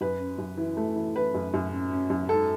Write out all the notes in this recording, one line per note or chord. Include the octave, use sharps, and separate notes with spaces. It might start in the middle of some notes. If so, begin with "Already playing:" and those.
F#2 B4
C#4
F#2
E3
A3
E3
E3 B4
F#2
F#2
C#4
C#4
F#2
G#2 A4